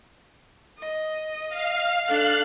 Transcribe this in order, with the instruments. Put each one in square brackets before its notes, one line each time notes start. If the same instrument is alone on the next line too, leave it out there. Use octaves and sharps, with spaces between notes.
[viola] D#5
[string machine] F5
[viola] D4 A4 [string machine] F5 F#6